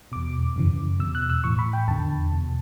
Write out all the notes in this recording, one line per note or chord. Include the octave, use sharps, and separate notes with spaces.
E2 B2 D6
F#2 C#3 E3
E2 B2 E6
F#6
E6
A2 E3 C#6
B5
G5
E2 D3 A5
E2 B2